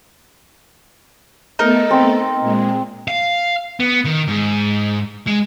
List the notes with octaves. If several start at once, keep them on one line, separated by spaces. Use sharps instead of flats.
A3 B3 D#4 A4 A#4
C4
A#2 G#3
F5
B3
D#3
G#2
G#3